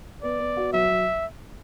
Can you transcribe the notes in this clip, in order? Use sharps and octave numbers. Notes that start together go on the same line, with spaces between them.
B3 D5
B3
F#4
F#3 E5
F#3